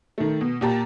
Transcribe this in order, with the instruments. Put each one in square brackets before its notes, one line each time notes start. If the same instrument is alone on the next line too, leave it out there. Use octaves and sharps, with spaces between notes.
[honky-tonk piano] D#3 A3
B2
A#2 G4 A5 A#5